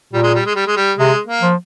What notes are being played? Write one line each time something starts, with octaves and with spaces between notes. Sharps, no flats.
A#2 G3
G#3
G3
G#3
G3
G#3
G3
C3 G#3
A#3
F3